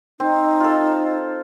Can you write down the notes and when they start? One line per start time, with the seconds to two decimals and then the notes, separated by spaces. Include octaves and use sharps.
0.20 C4 D#4
0.60 F4 A4